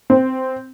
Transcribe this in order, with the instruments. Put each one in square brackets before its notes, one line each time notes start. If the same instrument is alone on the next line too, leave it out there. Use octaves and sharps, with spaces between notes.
[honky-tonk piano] C4